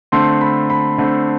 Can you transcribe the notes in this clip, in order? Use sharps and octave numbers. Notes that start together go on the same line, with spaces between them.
D3 A3 C4 C6
B5
B5
D3 A3 C4